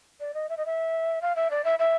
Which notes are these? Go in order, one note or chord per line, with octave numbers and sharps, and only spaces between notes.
D5
D#5
E5
D#5
E5
F5
E5
D5
E5
E5